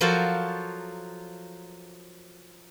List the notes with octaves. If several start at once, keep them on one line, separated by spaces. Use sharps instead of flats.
F3 F#3 F#4 A4 A#4 C5